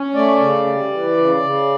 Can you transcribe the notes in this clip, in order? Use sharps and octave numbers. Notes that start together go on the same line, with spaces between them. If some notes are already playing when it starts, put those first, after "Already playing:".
Already playing: C#4
A3 D5
C#3
G3
E3
C#3
C#3